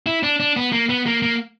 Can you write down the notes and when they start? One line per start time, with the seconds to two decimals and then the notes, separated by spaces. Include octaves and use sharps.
0.06 E4
0.23 D4
0.40 D4
0.57 B3
0.72 A#3
0.89 B3
1.06 A#3
1.22 A#3